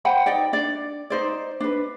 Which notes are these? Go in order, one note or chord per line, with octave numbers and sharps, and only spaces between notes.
C5 F#5 G5 B5
D#4 D5 G5
D4 D5
D#4 C5 D5
D4 B4